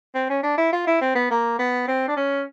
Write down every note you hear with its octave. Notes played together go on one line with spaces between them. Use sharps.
C4
C#4
D4
E4
F4
E4
C4
B3
A#3
B3
C4
D4
C#4